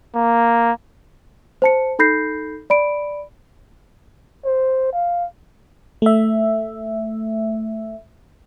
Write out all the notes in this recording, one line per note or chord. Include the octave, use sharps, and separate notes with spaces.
A#3
C5 A5 C#7
D#4 A4 B5 G6 A#6 C7
D5 B5 D7
C5
F5
A3 E5